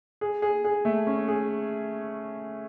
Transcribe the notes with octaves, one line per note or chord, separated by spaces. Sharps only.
G#4
G#4
G#4
A3
C#4
G#4